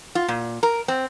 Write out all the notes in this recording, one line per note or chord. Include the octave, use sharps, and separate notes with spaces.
F4
A#2
A#4
C4